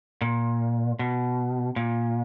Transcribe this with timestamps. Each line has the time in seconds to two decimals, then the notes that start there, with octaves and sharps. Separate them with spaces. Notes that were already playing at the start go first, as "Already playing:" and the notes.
0.21 A#2
0.99 B2
1.76 A#2